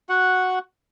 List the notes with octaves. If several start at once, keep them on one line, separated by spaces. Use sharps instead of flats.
F#4 F#5